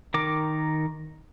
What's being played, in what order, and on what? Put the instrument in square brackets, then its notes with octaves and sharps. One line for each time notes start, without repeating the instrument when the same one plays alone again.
[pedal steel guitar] D#3 A#4 D6